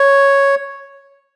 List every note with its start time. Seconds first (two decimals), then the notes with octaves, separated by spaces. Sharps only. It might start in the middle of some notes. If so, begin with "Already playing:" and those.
Already playing: C#5